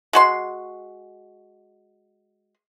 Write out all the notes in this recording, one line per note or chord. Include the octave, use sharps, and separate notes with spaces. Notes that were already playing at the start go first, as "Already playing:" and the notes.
G#3 F#4 C6